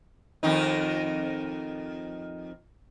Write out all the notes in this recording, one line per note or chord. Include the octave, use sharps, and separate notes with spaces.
F2 D#3 D#4